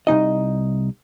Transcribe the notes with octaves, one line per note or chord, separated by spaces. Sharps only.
C2 A#2 D#4 D#5